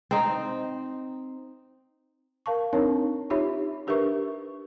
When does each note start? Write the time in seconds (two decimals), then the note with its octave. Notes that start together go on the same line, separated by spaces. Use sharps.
0.11 C4 D#4
2.46 A#4 F5 A5 C#6
2.73 C4 D4 D#4 A#4 C#5 A5
3.30 D#4 F4 G4 C#5 E5 B5
3.87 D4 G4 A#4 B4 E5 C#6